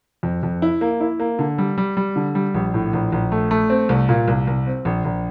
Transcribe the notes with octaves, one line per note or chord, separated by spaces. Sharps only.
F2
F2
E4
A#3
E4
A#3
D3
G3
G3
G3
D3
G3
A#1
A2
A#1
A#1
A3
A3
C4
C2
A#2
C2
C2
C4
A#1
A#1